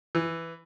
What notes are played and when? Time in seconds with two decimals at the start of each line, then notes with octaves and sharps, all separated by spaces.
0.15 E3